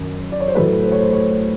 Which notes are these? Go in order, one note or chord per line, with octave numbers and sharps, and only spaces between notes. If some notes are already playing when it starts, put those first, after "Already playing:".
Already playing: F#2 D#3
D5
C#5
C5
A2 F#3 A3 B4
C5
C#5
C5
C#5